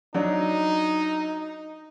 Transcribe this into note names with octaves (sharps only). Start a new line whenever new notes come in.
F#3 D4 D#4